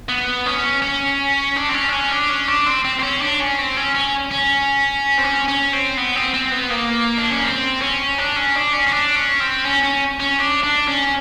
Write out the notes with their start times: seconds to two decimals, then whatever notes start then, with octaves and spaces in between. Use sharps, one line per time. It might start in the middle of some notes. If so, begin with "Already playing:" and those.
0.09 B3
0.46 C#4
0.82 C#4
1.56 D4
1.69 C4
1.74 C#4
1.88 D4
1.93 C#4
2.11 D4
2.29 C#4
2.48 D4
2.66 C4
2.85 C4
2.99 C4
3.03 C#4
3.21 D4
3.40 C#4
3.58 C4
3.77 C#4
3.95 C#4
4.32 C#4
5.18 C4
5.24 C#4
5.48 C#4
5.73 C4
5.97 B3
6.16 C4
6.34 C4
6.52 B3
6.71 A#3
7.18 D4
7.31 C#4
7.44 C4
7.81 C#4
8.18 D4
8.36 C#4
8.55 D4
8.73 C#4
8.87 C#4
8.91 D4
9.16 C#4
9.40 C4
9.65 C#4
9.83 C#4
10.20 C#4
10.39 D4
10.63 D4
10.88 C#4